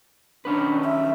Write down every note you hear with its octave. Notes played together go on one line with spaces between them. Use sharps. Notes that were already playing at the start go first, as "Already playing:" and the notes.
D#3 C#4 D4 B4
E5